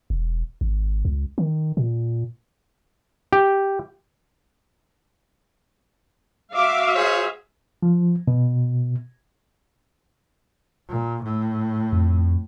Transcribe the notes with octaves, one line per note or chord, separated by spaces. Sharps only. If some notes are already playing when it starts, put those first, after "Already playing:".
E1
G#1
C#2
D#3
A#2
G4
F#4 E5 F5 D6
G#4 C5 C#5
F3
B2
A#2
A2
F2